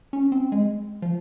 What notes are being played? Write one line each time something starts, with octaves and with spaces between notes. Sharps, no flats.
C#4
C4
G#3
F3